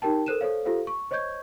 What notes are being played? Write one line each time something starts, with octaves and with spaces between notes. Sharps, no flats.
D#4 G4 A#4 G5 A5
A4 A#4 C5 F#6 D#7 E7
A4 C5 C#5 F5
F4 G4 A4 C5 F5
C#6
C5 C#5 D#5 C#6 G6 G#6